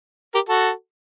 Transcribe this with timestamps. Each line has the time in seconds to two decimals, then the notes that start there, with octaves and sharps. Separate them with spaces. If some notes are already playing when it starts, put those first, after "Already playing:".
0.34 G4 A#4
0.49 F#4 A4